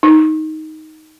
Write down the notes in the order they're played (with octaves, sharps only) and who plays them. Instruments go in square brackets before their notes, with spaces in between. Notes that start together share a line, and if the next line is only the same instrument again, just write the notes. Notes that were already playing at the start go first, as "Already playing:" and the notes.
[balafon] D#4